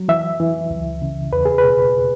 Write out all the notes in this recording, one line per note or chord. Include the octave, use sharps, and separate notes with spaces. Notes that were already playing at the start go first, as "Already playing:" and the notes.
Already playing: F#3
E3 E5
E3
C#2
C#3
E2 B4
G#4
B4
B2